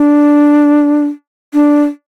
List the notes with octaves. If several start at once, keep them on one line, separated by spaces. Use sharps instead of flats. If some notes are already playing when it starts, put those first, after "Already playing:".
Already playing: D4
D4